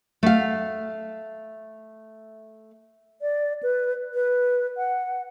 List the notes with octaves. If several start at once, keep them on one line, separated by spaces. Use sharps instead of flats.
A3 F5
D5
B4
B4
F#5